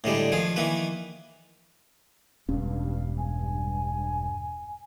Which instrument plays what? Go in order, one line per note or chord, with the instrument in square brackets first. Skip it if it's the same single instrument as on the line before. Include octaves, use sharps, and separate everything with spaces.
[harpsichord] A2 D3 G3 G#3
D#3 F3 G#4
D#3 E3 A#3 B4
[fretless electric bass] E1 C#4 [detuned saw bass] G2 [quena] F5
[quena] G#5